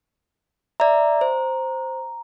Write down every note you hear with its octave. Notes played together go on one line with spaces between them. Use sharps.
D5 E5 A#5
C5